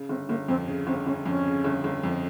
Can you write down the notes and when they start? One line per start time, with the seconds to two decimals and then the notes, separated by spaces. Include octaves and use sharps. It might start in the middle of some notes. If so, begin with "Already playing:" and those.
Already playing: C#3
0.09 G1 C4
0.29 G1 A#3
0.48 F2 C4
0.68 C#3
0.87 G1 C4
1.06 G1 C#4
1.25 F2 C#4
1.46 C#3
1.64 G1
1.84 G1
2.03 F2